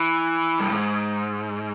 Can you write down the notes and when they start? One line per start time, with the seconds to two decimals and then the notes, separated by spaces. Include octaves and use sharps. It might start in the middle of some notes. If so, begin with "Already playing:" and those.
Already playing: E3
0.60 G2
0.70 G#2